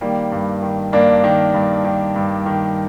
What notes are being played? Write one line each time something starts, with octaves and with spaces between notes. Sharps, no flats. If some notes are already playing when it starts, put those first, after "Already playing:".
D#3 G3 A#3
G2
D#3
G2 A#3 D4
D#3
G2
D#3
G2
D#3